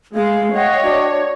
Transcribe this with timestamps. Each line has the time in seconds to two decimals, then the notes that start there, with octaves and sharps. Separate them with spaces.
0.15 G#3 F5
0.54 C#5 D#5 F#5 G5
0.83 D4 F#4